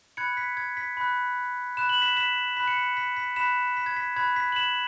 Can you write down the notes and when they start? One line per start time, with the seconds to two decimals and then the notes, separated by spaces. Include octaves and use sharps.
0.17 B5 F#6 G#6 C#7
0.37 B6
0.57 G#6
0.77 B6
0.97 B5 F#6
1.77 B5 F#6 E7
1.89 F#7
2.02 B6 E7
2.17 B6 E7
2.57 B5 F#6 B6
2.67 C#7
2.77 B6
2.97 B6
3.17 B6
3.36 B5 F#6 B6 E7
3.77 B6
3.86 G#6
3.97 B6
4.16 B5 F#6 G#6
4.36 B6
4.52 F#7
4.56 B6 E7